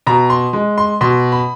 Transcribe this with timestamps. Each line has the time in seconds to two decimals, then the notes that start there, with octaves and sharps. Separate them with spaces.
0.07 B2 A#5
0.30 C6
0.53 G#3
0.78 C6
1.01 B2 C6
1.32 B5